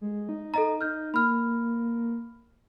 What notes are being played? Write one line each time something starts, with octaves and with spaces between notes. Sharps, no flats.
G#3
D#4
A4 D#5 A#5
D#4 F6 G6
A#3 B5 F6